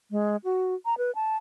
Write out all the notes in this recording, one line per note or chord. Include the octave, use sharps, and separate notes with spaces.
G#3
F#4
A#5
B4
A5